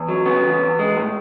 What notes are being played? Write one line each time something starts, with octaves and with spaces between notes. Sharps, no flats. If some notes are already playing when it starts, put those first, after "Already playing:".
Already playing: E2
F#3
C#3 B3
E2
E2
G#3
A2